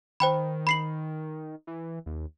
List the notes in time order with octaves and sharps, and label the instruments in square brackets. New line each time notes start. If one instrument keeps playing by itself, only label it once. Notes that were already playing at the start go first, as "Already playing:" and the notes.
[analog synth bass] D#3 [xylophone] C5 G5 B5
[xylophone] B5 C7 F#7
[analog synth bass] E3
D#2